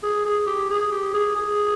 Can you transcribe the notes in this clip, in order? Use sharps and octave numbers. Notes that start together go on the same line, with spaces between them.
G#4
G#4
G4
G#4
G4
G#4
G#4